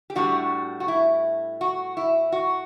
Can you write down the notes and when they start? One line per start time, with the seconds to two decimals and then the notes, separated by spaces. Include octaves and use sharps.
0.10 G4
0.15 A2 G3 D4 F#4
0.80 F#4
0.88 E4
1.61 F#4
1.97 E4
2.32 F#4